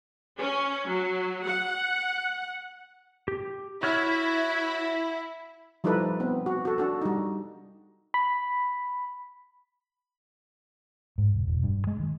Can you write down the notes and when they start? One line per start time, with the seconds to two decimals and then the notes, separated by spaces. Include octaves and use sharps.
0.38 C#4
0.87 F#3
1.46 F#5
3.28 G4
3.83 E4 F#4 C#5 F6
5.84 F3 G3 D#4 E4 A4 B4
6.20 B3 C4
6.46 F#4
6.65 F#4 A4
6.78 D4 F#4 A4
7.02 G3 D#4
8.14 B5
11.18 G#2
11.34 E1
11.48 E1
11.63 G2
11.87 G#3
11.99 D#3